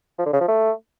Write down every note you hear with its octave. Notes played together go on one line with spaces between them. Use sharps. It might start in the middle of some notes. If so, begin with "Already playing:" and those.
F3
D3
C#3
F3
A3